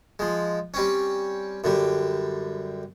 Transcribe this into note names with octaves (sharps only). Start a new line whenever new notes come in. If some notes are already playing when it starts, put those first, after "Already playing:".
F3 G#3
G3 C4 C#4
F#2 D3 G3